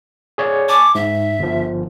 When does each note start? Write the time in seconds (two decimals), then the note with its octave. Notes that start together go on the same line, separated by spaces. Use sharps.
0.38 G#4 C#5 D5
0.69 G#5 A5 C#6 D6
0.95 G#2 E5
1.39 G1 F3